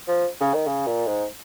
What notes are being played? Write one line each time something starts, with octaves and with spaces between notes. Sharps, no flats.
F3
C#3
D#3
C#3
A#2
G#2